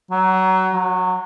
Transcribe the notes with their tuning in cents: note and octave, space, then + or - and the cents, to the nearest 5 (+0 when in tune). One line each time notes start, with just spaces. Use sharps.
F#3 +25
F#3 -15